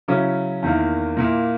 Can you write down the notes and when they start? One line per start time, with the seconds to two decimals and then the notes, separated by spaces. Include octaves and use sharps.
0.08 C#3 F#3 C#4 E4
0.62 E2 D#3 A#3 E4
1.17 A#2 A#3 E4